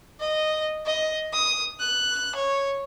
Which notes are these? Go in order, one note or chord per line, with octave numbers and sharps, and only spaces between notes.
D#5
D#5
D#6
F#6
C#5